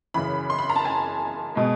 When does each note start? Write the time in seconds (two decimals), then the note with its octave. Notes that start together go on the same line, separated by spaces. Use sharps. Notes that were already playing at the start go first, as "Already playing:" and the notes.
0.14 F#2 C#3 E3 B5
0.50 C6
0.59 B5
0.69 A#5
0.76 A5
0.85 G#5
1.55 B2 G#3